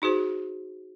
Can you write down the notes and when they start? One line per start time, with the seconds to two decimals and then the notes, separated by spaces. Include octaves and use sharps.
0.02 D#4 F#4 G#4 C5